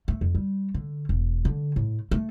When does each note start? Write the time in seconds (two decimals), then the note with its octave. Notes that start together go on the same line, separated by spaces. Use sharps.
0.08 A3
0.21 F2
0.35 G3
0.74 D3
1.09 E1
1.45 D3
1.76 A2
2.11 A3